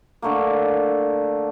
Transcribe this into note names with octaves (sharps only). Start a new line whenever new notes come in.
D3 A3 A#3